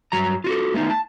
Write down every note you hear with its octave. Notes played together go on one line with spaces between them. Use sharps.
G2 F#3 A#5
F4 F#4 A4
A3 B3 C4 D#4
A5